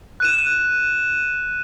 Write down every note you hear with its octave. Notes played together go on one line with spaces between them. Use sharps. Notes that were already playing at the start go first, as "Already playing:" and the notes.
F#6 D#7 E7